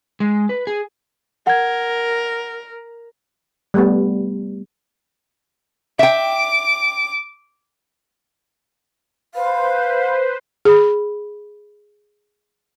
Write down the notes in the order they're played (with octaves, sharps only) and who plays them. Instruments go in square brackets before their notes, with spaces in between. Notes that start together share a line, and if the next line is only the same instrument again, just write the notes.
[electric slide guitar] G#3
B4
G#4
[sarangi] A#4 [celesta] F#5 G#6
[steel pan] G3 A3 B3
[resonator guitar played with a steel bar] E5 G5 [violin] D6
[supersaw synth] B4 C5 [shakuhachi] F5
[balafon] G#4 B5